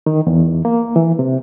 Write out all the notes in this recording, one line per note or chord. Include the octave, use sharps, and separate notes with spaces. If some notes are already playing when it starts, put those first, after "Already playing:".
D#3
E2
A#3
E3
C3